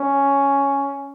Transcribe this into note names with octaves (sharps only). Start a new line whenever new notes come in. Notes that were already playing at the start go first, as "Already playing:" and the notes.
Already playing: C#4